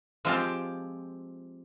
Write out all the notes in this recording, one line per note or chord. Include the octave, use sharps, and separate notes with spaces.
F3 G#3 C4 F4 G4 A5